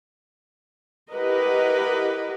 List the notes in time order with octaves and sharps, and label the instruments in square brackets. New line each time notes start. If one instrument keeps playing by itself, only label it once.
[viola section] E4 G4 A#4 B4 D#5 F#5